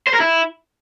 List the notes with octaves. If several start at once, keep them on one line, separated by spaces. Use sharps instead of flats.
C5
A#4
E4